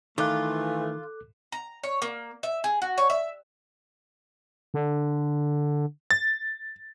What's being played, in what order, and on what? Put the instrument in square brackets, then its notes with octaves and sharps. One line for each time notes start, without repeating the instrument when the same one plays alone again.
[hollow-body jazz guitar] D#3 [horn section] E3 A3 [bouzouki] F4 [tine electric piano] A4 D6 F#6
[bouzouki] A#5
C#5
A#3
E5
G#4
F#4
C#5
E5
[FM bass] D3
[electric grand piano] A6